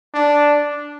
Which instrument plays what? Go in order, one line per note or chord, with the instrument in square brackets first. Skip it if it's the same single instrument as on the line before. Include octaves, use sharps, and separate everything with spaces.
[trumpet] D4